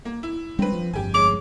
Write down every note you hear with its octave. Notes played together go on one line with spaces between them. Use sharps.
A#3
E4
G3 G#3 C4 D4 B4
F3
G1 F2 G4 G#5
G#3 C#4 D6 F7